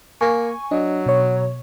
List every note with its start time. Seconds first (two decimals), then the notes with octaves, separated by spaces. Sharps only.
0.21 A#3 G#5 C#6
0.71 F#3 D4 D#5
1.06 B2 C#5